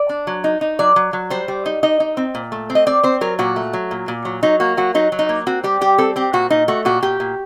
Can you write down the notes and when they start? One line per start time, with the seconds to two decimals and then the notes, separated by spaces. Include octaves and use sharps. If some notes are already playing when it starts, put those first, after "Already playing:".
Already playing: D5
0.09 D4
0.27 F#3
0.44 D#4
0.61 D#4
0.79 F#3 D5
0.96 F#3
1.13 F#3
1.30 G3 C5
1.48 G3
1.66 D#4
1.83 D#4 D#5
2.00 D#4
2.17 C4
2.35 A#2
2.52 A3
2.70 C4
2.75 D#5
2.87 C4 D5
3.03 C4 C5
3.21 F#3 A#4
3.39 A#2 F#4
3.56 A3
3.73 F#3
3.91 A#2
4.08 A#2
4.25 F#3
4.43 F#3 D#4
4.60 A#3 F#4
4.77 F#3 F#4
4.94 F#3 D#4
5.12 F#3
5.19 D#4
5.29 A#3
5.47 C4 F#4
5.64 G3 G4
5.81 G3 G4
5.98 C4 A4
6.16 C4 G4
6.33 A#2 F#4
6.50 A#2 D#4
6.68 A3 F#4
6.85 A#2 F#4
7.02 A#2 G4
7.20 A#2